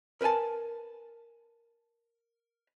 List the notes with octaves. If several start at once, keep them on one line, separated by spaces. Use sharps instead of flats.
A#4 B4 D#5 G#5 A5